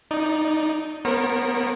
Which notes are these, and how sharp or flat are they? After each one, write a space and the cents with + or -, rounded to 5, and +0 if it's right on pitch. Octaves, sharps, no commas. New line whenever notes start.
D#4 +0 D5 +0
B3 +0 A#4 +0 C#5 -45